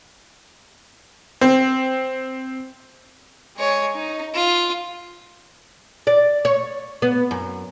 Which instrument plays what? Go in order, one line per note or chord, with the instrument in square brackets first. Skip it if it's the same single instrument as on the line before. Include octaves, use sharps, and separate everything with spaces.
[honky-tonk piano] C4
[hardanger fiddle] G#3 C#5
D#4
F4
[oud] D5
C#5
B3
F#2